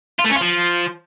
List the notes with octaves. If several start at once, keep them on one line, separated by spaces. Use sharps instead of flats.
F4
A3
C#4
F4
F3